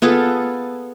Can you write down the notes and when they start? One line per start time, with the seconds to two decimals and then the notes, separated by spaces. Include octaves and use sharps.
0.02 B3 F4 G#4 A4